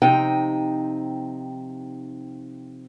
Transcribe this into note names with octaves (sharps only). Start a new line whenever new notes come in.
C3 F3 D#4 G5